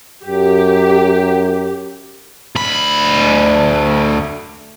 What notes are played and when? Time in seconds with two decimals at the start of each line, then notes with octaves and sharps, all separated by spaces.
0.25 F#2 G4
2.55 D2 B5